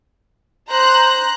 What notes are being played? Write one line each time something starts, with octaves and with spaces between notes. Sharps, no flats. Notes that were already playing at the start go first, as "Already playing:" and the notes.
C5 A#5 F#6